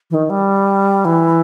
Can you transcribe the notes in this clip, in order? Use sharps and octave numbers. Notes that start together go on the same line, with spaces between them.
E3
D#3
G3
E3